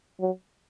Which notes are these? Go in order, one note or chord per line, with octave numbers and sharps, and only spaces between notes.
F#3